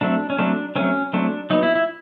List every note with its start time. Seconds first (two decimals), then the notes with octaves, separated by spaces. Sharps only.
0.01 F#3 A3 C4 D4
0.30 C#4
0.39 F#3 A3 C4 D4
0.75 F#3 A3 C4 C#4
1.13 F#3 A3 C4 D4
1.50 F#3 B3 D#4
1.63 E4
1.75 E4